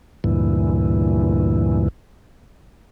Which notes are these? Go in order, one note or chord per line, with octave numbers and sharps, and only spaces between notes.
D2 G2 A#2 E3